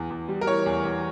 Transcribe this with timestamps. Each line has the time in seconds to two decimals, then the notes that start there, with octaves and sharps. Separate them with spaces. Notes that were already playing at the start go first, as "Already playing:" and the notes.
Already playing: E2
0.10 E2
0.28 G3
0.41 A#4
0.47 E3 C#5
0.66 E2
0.85 E2